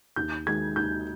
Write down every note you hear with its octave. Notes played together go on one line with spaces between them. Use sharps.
D#2 G6
D#3 G#3 G#6
D#2 G6